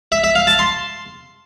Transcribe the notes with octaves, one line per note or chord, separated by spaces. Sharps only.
E5
E5
F5
A5
C6